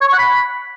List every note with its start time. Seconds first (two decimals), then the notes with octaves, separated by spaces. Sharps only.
0.01 C#5
0.07 C#6
0.13 F#5
0.19 B5